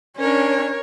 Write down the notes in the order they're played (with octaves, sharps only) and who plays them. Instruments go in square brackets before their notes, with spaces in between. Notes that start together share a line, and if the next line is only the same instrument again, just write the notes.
[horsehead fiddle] C#4 D4 [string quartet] A#4 C#5